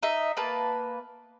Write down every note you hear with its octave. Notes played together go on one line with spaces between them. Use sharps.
D#4 D#5 E5
A#3 B4 A5